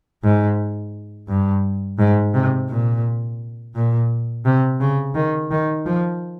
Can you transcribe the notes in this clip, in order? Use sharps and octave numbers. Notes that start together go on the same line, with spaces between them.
G#2
G2
G#2
C3
A#2
A#2
C3
C#3
D#3
D#3
F3